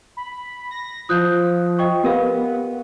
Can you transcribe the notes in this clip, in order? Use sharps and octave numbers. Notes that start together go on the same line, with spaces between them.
B5
A#6
F3 D#6 F#6 G6
D#5 G5 C#6
B3 G4 A#4 F5